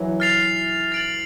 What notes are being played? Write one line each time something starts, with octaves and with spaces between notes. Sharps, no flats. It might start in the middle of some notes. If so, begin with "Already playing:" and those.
Already playing: E3 F#3
F6 A6 C7 F7
A6 D7 F#7